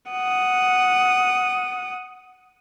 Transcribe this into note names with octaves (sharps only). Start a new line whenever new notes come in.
F#5 D#6